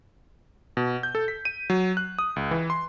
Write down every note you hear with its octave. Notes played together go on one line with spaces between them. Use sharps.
B2
G6
A4
B6
D#7
F#3
F#6
D#6
C#2
E3
C6